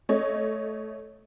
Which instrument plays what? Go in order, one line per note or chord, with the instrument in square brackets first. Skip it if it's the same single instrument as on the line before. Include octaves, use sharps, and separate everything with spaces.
[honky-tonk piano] A3 C#5 D#5